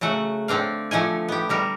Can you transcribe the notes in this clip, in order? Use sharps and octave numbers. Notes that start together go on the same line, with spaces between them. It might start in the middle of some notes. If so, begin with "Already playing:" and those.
C#3 F#3 A3 F#5
D3 C4 D4 F5
D3 F3 A3 G#5
B3 G4
D3 G3 A#4